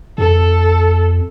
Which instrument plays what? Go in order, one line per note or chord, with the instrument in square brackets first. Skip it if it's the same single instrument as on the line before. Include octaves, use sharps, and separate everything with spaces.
[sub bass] F2 [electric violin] A4